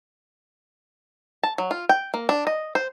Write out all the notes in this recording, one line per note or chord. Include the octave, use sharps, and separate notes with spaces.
A5
F#3
F4
G5
A#3
D4
D#5
C5